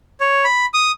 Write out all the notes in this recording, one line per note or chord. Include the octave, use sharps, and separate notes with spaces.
C#5
B5
D#6